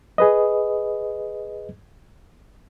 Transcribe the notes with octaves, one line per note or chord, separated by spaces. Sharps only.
G#4 B4 D#5